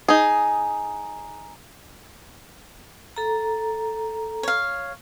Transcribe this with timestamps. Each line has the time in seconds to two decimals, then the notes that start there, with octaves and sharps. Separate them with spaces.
0.08 D#4 G#4
3.16 A4 A#5
4.43 C#5 F5